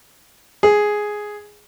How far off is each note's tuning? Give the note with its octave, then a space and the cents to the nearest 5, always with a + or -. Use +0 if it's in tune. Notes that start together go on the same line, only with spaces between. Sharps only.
G#4 +5